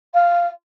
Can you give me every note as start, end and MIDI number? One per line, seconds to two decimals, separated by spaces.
0.14 0.47 77